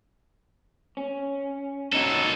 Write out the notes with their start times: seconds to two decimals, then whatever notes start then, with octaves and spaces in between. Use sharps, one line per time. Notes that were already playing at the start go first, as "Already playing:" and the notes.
0.97 C#4
1.93 A#2 C#4 D#4 F#4 A4